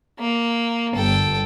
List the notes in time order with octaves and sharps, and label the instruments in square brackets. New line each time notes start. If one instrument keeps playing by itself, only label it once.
[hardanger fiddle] A#3
[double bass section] G1 [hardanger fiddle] A4 G5